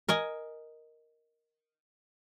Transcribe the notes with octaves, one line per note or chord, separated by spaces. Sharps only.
A#4 D#5 G#5